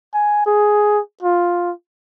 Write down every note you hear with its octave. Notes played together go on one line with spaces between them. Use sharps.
G#5
G#4
F4